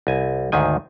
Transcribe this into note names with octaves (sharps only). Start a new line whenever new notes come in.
C2 G#5
D2 G#2 D#3 G#5